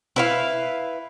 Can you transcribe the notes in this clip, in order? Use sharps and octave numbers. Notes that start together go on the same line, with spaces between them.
E4 B4 F5